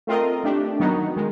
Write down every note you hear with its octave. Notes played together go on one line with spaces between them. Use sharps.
A3 C4 F4 A#4 D#5
A3 D4 G4
D#3 F#3 B3 D#4 F#4
D#3 G#3